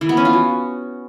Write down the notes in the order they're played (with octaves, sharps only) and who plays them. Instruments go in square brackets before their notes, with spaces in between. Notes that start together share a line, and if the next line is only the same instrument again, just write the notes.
[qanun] E3
B3
C#4
F4
F#4